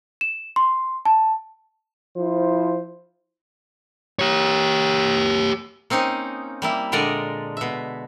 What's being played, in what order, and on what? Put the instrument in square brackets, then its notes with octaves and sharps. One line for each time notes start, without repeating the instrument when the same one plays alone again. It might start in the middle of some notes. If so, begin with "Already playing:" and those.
[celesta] E7
C6
A5
[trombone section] F3 E4 C5
[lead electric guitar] G4 C#5
[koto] A#3 C4 C#4 D#4
G3 A#3 E4
A#2 D3 G#3 A#4 D5 D#5
B2 E5